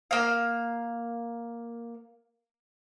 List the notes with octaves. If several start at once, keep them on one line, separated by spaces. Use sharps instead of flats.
A#3 F5